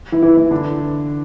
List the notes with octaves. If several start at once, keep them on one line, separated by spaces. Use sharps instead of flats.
E3 E4
E3 E4
E3 E4
D3 D4